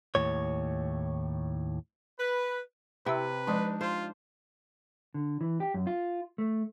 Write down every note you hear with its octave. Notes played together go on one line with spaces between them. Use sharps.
D#2 A2 C#5
B4
C3 E4 G4 B4 E5
F3 G#3 D4 D#4
F4 C5
D3
E3
G4
F#2
F4
A3